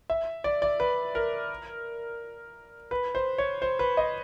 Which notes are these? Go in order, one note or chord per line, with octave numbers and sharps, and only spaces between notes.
E5
D5
D5
B4
A#4
B4
C5
C#5
C5
B4
D#5